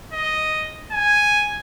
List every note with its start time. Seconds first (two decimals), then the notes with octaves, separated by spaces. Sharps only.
0.13 D#5
0.92 G#5